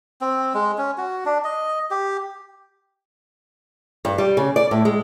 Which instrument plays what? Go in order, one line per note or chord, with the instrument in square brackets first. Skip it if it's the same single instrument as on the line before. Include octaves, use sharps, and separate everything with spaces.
[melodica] C4
G#3
C#4
F#4
D4
D#5
G4
[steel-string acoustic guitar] G2
G3
C#3
D5
A2
G#3